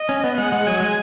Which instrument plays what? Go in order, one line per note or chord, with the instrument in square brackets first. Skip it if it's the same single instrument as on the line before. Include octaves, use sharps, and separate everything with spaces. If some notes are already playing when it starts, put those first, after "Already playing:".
Already playing: [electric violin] D#5
[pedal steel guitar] C#4
B3
[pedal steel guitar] G#3 [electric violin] F#5
[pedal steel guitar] G#3
[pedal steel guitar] F#3 [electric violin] G#5
[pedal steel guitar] G#3